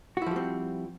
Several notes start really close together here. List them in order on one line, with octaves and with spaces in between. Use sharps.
F#4 E4 F3 G3 C4